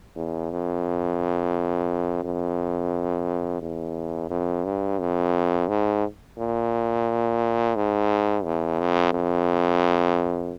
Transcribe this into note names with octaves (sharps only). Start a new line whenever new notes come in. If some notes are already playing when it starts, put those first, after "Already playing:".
E2
F2
F2
E2
F2
G2
F2
G#2
A#2
G#2
E2
F2
F2